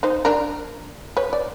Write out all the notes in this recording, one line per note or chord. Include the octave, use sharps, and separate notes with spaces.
D#4 C5
D4 A#4
B4 C#5
D5